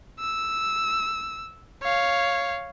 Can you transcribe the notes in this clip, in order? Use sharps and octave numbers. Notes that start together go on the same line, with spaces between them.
E6
C#5 F5